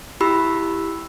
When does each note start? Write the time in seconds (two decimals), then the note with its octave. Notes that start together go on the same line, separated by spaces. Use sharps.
0.20 E4 G4 B5 E6